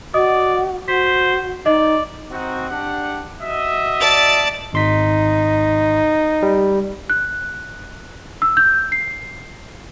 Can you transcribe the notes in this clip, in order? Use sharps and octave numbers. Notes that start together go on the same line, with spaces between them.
F#4 D5 D#5 D#6
F#4 C5 B6
D#4 D5 D#5
C4 D#4 F#4
D4 G4 F#5
F#4 D#5 E5
D5 A5
G#1 D#4 C6 B6
G3
F#6
E6
G6
C7